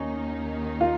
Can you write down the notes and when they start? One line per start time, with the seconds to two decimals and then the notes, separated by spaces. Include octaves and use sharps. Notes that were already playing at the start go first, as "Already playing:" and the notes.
Already playing: D#2 D#3 A#3 C#4 D#4
0.81 F4